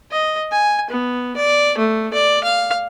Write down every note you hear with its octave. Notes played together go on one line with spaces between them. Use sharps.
D#5
G#5
B3
D5
A3
D5
F5